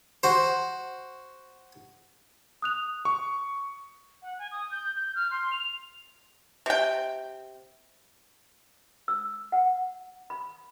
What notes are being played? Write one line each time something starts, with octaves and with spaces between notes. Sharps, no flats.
F#4 C5
D#6 F#6 F7
C#6
F#5
G#5
D#6
G6
G6
F6
C6
F7
C3 G5
E6
F#5
B5